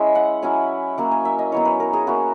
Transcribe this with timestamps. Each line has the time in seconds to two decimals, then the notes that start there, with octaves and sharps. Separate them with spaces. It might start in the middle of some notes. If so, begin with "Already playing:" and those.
Already playing: G#3 C#4 E4 E5
0.15 F#5
0.42 F#3 C#4 E4 G#5
0.98 F#3 A#3 C#4
1.11 G#5
1.25 E5
1.39 D#5
1.52 F#3 B3 E4 C#5
1.65 B4
1.80 A#4
1.93 G#4
2.07 A#3 C#4 E4 F#4